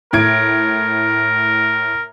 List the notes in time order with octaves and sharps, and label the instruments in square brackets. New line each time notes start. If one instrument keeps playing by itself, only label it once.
[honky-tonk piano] A2 G#6 D7 [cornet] A#4